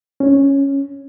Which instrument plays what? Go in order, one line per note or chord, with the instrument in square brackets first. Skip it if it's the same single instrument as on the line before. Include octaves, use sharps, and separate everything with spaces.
[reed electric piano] C#4